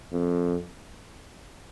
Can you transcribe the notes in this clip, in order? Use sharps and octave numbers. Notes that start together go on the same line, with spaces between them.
F2